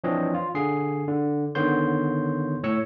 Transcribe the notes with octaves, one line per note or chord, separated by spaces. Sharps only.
E3 F3 C4 D4 C#5 D#5
F4
D3 G#4 C7
D3
D3 D#3 B3 C#5 C6 G6
A2 C#5 E6 C#7